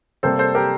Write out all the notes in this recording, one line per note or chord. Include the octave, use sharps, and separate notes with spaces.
C3 G3 A#3 A4 C5
A4 C5
G4 A#4